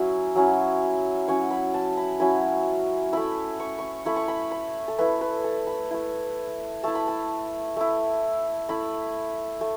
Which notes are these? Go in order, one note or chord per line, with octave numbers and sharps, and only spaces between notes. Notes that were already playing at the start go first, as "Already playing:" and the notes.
Already playing: F#3 C#4 E4
F#3 C#4 E4
F#3 C#4 E4 C#6
B5
A5
B5
F#3 C#4 E4 B5
A3 E4 B5
C#6
C#6
A3 E4 B5
C#6
B5
B5
A4
A3 E4 B4
B4
A4
B5
A3 E4
A3 E4 A5
B5
A5
A3 E4
A3 E4 B5
A3